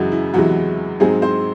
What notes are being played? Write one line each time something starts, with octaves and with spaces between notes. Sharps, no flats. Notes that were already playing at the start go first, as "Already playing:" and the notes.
Already playing: F#2 C#3 E3 F#3 G#3 F#4
E4
E2 C3 E3 F#3 G#3 F#4
G#2 F#3 G#3 C4 G#4
C4 C5